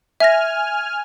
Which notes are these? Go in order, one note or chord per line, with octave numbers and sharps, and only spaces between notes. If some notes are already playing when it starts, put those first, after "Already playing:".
E5 G#5 F6 A#6